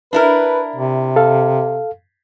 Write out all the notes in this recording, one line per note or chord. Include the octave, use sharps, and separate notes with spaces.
D4 E4 A#4 B4
C3
A4 F5